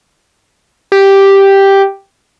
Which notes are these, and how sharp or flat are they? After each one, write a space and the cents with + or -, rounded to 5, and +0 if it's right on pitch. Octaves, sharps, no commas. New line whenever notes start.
G4 +0